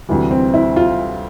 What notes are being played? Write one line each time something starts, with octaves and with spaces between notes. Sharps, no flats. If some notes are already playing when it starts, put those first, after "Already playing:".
D2 C3 E3 G3
C4
E4
F4